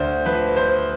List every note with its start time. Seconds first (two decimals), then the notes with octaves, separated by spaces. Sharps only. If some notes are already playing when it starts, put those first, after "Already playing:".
Already playing: D2 D3 C5 D5
0.26 F3 B4
0.56 C5